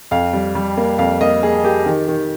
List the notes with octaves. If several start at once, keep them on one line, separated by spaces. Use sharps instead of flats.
F2 F5
G3
G3
A#3
F2 F5
A#3 D#5
A#3 G#4
A#3 G4
D#3
D#3